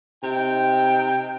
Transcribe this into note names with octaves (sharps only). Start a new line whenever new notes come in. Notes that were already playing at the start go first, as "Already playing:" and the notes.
C3 D#4 G5